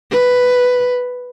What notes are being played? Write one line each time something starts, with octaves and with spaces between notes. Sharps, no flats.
B4